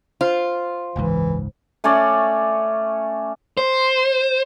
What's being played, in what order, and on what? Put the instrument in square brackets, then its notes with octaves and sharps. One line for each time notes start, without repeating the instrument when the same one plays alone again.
[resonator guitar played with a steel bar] F4 [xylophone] C5
[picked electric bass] F#1 C#2 G#2 [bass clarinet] E3
[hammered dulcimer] A3 C#4 C#5 D5
[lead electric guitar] C5